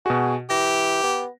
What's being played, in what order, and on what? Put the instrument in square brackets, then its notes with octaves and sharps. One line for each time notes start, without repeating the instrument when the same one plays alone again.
[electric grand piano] B2 F#4 [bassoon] G#4
[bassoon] E3 [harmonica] G4 [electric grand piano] A#6
[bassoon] B3